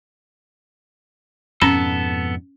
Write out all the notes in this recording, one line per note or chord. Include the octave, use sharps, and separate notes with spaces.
F2 G#2 B2 B3 C#4 A4 B5